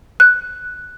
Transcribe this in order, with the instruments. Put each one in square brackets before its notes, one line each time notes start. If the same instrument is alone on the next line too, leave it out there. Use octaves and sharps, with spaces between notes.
[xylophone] F#6